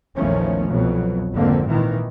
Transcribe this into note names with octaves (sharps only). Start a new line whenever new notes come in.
A#1 E2 D#3 F3 A3 C#4
C2 F2 B2 F#3
G#1 F2 D3 A#3 C4
A#2 D#3 E3